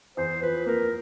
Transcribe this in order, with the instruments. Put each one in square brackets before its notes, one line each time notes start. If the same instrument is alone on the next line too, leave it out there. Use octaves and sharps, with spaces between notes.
[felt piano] E2 [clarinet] C5
[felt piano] F3 [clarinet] B4
[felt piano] A#3 [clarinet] A#4